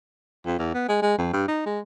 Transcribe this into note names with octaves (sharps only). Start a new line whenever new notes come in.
F2
E2
B3
G#3
G#3
F2
G2
D#4
G#3